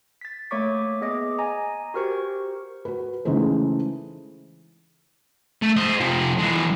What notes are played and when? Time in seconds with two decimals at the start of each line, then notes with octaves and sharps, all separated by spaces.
0.21 A6 B6
0.51 A3 A#3 C#5 C#6 D6 B6
1.01 B3 G#4 D#5 D6
1.38 D#5 G#5 A#5
1.94 F#4 G4 A#4 C5 C#6
2.85 F#4 B4
3.25 C#3 E3 G#3 A3 D#4 C5
5.62 A3
5.77 C5 D#5
6.00 C3 F3
6.39 E3 G#3